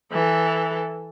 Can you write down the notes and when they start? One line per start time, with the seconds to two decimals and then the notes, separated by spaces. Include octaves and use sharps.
0.12 E3 A4